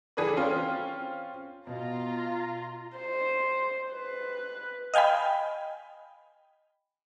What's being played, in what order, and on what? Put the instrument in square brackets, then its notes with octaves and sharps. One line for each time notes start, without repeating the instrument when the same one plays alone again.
[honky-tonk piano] E3 G#4 A4 B4 D5
C4 C#4 F4
[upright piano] B2 [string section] F4 A#5
[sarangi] C5
B4
[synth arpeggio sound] D#5 F5 G5 G#5 B5